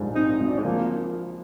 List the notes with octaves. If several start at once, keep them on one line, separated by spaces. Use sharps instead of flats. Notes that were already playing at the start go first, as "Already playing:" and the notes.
Already playing: A#1 G#2 G3
C4 D#4
D#4
G#1
D4
G#3
F3 A#3